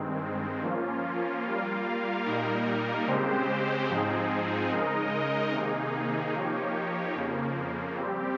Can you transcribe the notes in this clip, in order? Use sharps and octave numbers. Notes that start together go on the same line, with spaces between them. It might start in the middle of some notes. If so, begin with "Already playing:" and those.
Already playing: G2 D#3 G#3 C4
F3 A#3 C#4 F4
G3 A#3 F4 A#4 F5
A#2 G3 A#3 D#4 A#4
C#3 G#3 C4 G4 C5
G#2 F3 C4 D#4 G#4
C#3 G#3 D#4 A#4 D#5
C3 D#3 A#3 D#4 G#4
F3 A#3 D#4 G4 C#5
F2 C#3 F3 A#3
G3 C4 G4